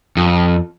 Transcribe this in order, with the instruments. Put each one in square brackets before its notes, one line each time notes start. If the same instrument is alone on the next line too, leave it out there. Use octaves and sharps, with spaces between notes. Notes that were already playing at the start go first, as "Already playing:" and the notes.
[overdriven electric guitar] F2